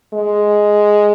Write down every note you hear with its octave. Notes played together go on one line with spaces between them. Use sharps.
G#3